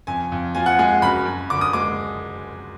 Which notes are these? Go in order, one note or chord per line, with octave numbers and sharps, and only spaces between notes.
F2 G#5
F2
F3 G#5
F#5
G#3 G#5
F#2 B5
F#2
D3 D6
D#6
G#3 D6